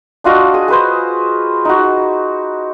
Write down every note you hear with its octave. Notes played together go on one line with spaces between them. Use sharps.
D4 F4 F#4 D#5
G#4 D#6
G#4 B4 C5
D#4 F#4